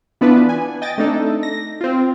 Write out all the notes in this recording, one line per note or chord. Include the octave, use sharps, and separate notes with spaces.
E3 B3 D4 F4 B4
G#5
D#5 G5 G#5 A6 A#6 D7
A3 C4 D4 D#4 A4
A#6
C4 F4